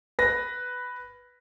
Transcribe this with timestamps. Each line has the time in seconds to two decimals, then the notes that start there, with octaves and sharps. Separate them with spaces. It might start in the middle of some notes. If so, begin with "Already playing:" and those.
0.19 B4 A#6